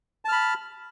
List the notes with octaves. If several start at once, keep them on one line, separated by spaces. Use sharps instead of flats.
A5 B5 F6